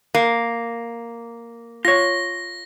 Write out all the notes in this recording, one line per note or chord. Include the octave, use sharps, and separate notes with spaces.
A#3
F4 C#5 A#6